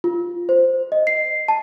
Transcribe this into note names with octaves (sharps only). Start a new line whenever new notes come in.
F4
C5
D#5
C7
A5